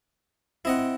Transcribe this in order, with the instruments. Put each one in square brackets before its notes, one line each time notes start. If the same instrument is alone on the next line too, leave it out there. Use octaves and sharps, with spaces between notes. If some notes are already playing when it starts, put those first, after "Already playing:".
[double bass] C4 [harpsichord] E4 D#5 F#5